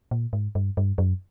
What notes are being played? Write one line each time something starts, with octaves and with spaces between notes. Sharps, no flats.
A#2
G#2
G2
G2
F#2